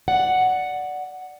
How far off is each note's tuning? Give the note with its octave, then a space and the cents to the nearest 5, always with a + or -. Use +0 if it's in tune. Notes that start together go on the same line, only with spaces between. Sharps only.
D5 +0 F#5 +0